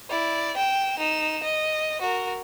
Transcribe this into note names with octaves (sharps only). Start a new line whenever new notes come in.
E4 D5
G5 E7
D#4 E7
D#5
F#4 A#4